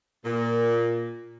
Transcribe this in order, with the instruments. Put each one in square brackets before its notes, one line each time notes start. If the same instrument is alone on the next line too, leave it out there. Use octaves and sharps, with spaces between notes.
[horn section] A#2